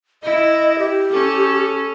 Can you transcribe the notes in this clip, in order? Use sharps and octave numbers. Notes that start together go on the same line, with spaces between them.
E4 D#5
G4
C#4 A4